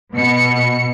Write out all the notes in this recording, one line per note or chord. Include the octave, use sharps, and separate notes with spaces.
B2 C#7